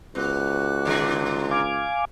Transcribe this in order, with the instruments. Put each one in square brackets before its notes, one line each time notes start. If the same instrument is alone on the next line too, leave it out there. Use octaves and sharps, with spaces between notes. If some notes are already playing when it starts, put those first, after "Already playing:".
[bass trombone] C#2 [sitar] B3 [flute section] F#4 D6 F#6
[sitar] A#2 D3 G#4
[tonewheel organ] F5 G#5 D6